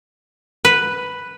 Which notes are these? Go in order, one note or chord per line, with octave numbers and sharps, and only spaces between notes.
B4